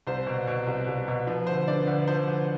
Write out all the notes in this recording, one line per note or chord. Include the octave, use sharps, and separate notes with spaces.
C2 C5
B2
B2
C2
C2
B2
F3 B4
D2 C5
D3 B4 D5
D2 B4
F3 C5
D2 B4